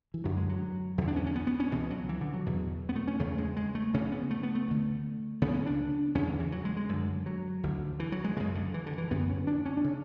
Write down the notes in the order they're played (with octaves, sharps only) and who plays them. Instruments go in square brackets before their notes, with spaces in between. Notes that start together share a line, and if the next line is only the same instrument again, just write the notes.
[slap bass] E3
F#2 D3 F#3
G#3
F#3
E2 E3
D3
D4
C#4
C#4
B3
B3
C#4
C#2 B2 E3
F#3
E3
D3
F#3
E2 B2
B3
A3
C#4
E2 C#3 A3
G#3
G#3
A3
D2 C#3 C#4
B3
A3
B3
A3
D2 D3
C#2 C#3 B3
C#4
D4
E2 C#3 C#4
D3
E3
F#3
G#3
G#3
F#2 D3
F#3
D2 D3
E3
F#3
G#3
F#2 C#3 G#3
D3
E3
D3
E3
F#2 D3 B3
C#4
D4
C#4
D4
C#3